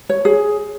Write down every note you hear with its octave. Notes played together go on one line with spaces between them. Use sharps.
C#5
G#4